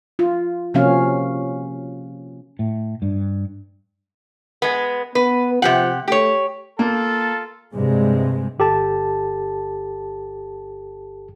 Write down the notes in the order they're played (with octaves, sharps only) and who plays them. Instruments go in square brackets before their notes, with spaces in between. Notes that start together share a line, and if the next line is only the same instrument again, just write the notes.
[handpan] F4
C3 F3 A#3 C#4 F#4 F5
[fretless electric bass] A2
G2
[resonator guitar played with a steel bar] G#3 B3
[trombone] B3 [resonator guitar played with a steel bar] B4
[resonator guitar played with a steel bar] C3 G4 F#5 [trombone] F3
[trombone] A3 [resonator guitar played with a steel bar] G4 C#5
[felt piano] A#3 [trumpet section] F4 A4
[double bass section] G2 C3 G#3
[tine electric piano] G1 G4 A4 A5